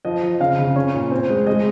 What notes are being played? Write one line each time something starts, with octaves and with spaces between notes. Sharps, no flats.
F3 D#5
F3
C#3 F5
C#3
C#4
A#2
C4
G#3
G#3 D#5